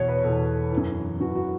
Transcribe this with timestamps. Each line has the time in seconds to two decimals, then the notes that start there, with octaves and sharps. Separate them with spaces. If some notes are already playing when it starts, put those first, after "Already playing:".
Already playing: E2 B2 C#5
0.08 B4
0.24 E2 B2 A4
0.72 E3
0.77 F#2
1.20 F#2 E3 F#4
1.36 F#4